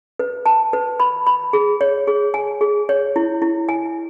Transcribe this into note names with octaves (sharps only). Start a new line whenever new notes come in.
B4
A5
B4
B5
B5
G#4
C#5
G#4
G#5
G#4
C#5
E4
E4
G#5